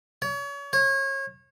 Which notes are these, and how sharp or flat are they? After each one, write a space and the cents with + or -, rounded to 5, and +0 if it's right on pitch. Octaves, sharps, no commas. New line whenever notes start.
C#5 +35
C#5 -30